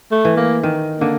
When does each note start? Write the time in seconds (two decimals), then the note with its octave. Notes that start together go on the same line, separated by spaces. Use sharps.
0.11 A3
0.25 E3
0.37 A#3
0.63 D#3
1.00 D3 A#3